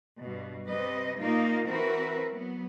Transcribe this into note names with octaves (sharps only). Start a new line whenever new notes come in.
G2 B2
C3 G3 C4 B4 D#5
A#2 A#3 D#4 F4 D#5
E3 C4 F#4 A#4 B4 E5
F#3 B3